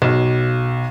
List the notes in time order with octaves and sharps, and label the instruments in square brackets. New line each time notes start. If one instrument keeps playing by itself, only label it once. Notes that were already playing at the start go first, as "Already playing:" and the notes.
[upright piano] B1